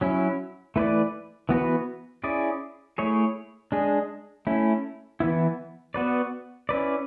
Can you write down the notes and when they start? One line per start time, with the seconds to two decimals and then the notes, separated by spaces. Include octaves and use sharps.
0.01 F#3 C#4 E4
0.76 E3 A3 E4 B4 D5
1.49 E3 B3 F#4 B4
2.24 C#4 E4 G#4 D5
2.98 A3 E4 G#4 C#5
3.72 G#3 D4 G#4
4.47 A3 C#4 E4
5.20 E3 B3 E4
5.94 B3 F#4 B4 D5
6.69 C#4 E4 B4 D5